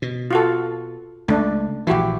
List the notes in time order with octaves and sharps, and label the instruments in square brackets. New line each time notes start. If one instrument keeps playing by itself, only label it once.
[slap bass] B2
[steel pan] F4 F#4 A4
[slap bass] C#2 [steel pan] A3 D4
[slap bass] A#1 E3 [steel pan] E4 F#4 G4